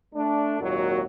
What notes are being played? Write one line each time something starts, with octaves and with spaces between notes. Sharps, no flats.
A3 D4
G#1 D#2 A#2 F#3 F#4